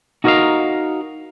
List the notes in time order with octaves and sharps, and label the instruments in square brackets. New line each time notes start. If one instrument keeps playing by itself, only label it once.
[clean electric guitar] D#4 F#4 A#4 C#5 D#5 F5